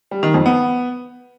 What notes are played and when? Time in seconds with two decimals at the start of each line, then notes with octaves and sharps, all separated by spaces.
0.11 G3
0.23 D#3
0.34 F2
0.46 B3